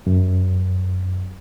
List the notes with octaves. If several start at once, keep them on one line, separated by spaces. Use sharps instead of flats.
F#2